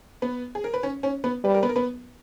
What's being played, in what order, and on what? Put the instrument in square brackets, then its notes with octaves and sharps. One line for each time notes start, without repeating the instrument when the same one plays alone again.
[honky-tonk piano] B3 B4
G#4
A#4
B4
C#4 C#5
C#4 C#5
B3 B4
[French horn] G3 [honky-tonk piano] B4
[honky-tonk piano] A#4
B3 B4
A#4
B3 B4